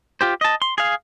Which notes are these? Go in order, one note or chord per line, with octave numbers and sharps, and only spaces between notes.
F4 G4 C5
D#5 A5
C6
G#4 F5